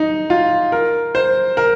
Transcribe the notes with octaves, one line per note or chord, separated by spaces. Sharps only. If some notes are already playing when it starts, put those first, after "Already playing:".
Already playing: D#4
F4
A#4
C5
A#4